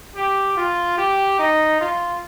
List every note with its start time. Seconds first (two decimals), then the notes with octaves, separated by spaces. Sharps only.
0.15 G4
0.57 F4
0.98 G4
1.39 D#4
1.81 F4